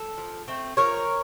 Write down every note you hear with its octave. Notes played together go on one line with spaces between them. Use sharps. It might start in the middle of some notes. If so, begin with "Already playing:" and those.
Already playing: A4
F3
A3 C4
F3 A#4 C#5